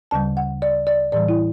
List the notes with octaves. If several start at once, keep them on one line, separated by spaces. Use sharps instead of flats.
D2 C#3 G3 A5
F#5
D5
D5
A2 E3 G3 D5
E4